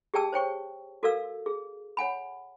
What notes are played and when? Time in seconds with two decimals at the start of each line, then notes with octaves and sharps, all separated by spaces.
0.14 G4 G#4 D5 G5 A5 E6
0.33 C5 C#5 G5 C#6
1.03 F#4 A4 A#4 D5 F5 E6
1.46 G#4
1.97 C#5 F#5 G#5 B5